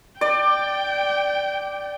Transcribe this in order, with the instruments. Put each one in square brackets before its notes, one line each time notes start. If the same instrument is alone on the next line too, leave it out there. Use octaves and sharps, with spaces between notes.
[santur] D5 [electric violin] G5